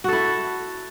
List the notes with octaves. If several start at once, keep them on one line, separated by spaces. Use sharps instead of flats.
E4 F#4 A4